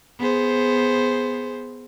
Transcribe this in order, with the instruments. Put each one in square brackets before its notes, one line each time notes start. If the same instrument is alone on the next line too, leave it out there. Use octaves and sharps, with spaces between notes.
[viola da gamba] B3 G#4 C5